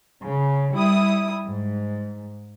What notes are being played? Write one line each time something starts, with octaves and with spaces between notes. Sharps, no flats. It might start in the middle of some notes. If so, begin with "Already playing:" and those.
C#3
G3 E4 D#6
G#2